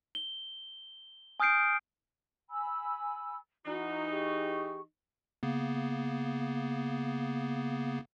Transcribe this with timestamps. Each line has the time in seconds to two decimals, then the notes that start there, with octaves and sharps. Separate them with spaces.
0.15 G7
1.40 G#5 D#6 F6 G6 C7 D7
2.49 G#5 B5 E6
3.66 E3 D#4 F#4 A#5
4.10 G4 G#4 C#6
5.43 C#3 A#3 B3